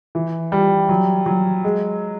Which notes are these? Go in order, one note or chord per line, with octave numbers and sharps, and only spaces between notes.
E3
G3
F#3
F#3
G#3